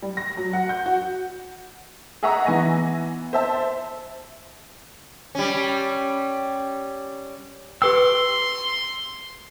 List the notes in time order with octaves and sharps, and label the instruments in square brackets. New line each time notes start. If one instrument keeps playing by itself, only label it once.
[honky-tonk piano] G3
A#6
F#3
F#5
G6
F#4
G#4 D#5 E5 F#5 A#5 C#6
E3 B3 G#5 A#6
C5 E5 A5
[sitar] G3 C#4
[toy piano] G4 B4 G5 [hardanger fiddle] C6 [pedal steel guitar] D6 E6